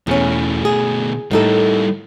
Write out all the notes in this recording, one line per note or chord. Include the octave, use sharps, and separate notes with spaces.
E2 B2 A3 C#4
G#4
A2 G3 A#3 D#4 A4